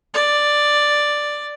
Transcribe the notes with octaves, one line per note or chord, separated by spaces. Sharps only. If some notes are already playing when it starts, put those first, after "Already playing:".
D5